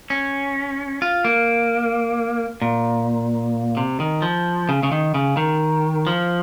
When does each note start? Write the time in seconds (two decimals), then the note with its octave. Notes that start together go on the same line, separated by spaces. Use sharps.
0.10 C#4
1.02 F4
1.25 A#3
2.62 A#2
3.77 C3
4.00 D#3
4.22 F3
4.69 C#3
4.83 C#3
4.92 D#3
5.14 C#3
5.37 D#3
6.07 F3